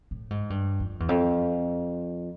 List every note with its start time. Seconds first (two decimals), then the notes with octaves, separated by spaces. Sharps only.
0.11 A2
0.30 G#2
0.50 G2
0.80 F2
1.00 E2
1.09 F2